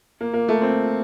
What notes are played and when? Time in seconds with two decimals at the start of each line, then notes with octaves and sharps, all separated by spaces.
0.21 A#3
0.33 A#3
0.48 A3
0.62 C4